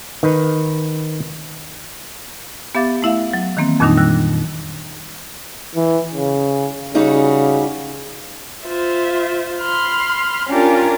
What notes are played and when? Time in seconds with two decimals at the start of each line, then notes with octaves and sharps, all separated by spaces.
0.23 D#3 B4
2.75 B3 G4 E5 F5 D6 A6
3.02 A3 E4 E5 F5
3.33 F#3
3.57 D#3 E3 A#3 C4
3.80 F2 A#2 D#3 G3 D4 D#4
3.97 G3 E6 F#6
5.76 E3
6.14 C#3
6.95 C#3 G3 D#4 F#4
8.65 F4 C5 E5
9.60 B5 C6 F6
10.48 C#4 D4 F4 G4 A#4